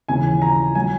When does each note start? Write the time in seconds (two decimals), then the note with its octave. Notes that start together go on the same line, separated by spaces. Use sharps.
0.08 D#2 C#3 E3 G#5
0.42 A#5
0.75 F#3 G#5